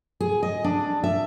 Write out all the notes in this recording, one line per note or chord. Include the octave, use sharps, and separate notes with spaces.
G#4
D#5
D4
E5